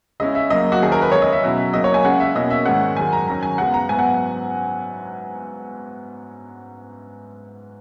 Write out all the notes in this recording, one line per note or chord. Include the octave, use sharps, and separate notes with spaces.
C#3 G#3 C#4 E4 D#5
E5
F#2 C#3 F#3 A#3 D#5
F#4
D#3 F#3 C#4 E4 G#4
A#4
B4
C#3 E3 G#3 C#5
D#5
E5
B2 F#3 C#4 E4
C#3 F#3 A#3 D#5
C#5
G#5
C#3 G#3 C#4 F#5
E5
B2 A#3 C#4 E4 D#5
E5
G#2 D#3 G#3 C#4 F#5
F#2 D#3 G#3 G#5
A#5
D#3 F#3 C#4 A#5
G#5
F#2 C#3 G#3 B3 F#5
A#5
G#2 F#3 B3 E4 G#5
F#5